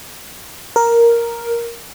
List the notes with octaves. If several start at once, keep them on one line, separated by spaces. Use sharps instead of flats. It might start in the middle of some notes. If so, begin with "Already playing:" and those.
A#4